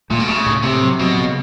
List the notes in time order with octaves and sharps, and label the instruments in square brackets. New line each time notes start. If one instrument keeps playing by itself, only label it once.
[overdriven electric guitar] A#2 [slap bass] A3
[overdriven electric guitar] B2
[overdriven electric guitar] C#3 [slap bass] A3
[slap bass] A2
[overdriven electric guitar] C3 [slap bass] A3
[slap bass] F#3
[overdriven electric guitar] B2 [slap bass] F#3
[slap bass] C#3